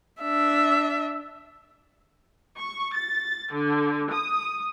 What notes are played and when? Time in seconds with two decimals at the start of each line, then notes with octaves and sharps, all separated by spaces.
0.21 D4 E5
2.58 C#6
2.95 A6
3.52 D3
4.12 D#6